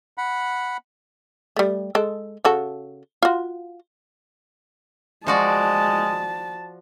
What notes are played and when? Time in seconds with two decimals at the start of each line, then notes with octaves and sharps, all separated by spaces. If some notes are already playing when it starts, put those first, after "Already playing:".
0.18 F#5 B5
1.57 G3 A3
1.95 G#3 A4
2.45 C#3 F#4 A4
3.23 F4 F#4
5.27 F3 G#3 F#4 D5 A5